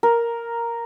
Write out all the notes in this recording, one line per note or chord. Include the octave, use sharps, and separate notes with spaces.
A#4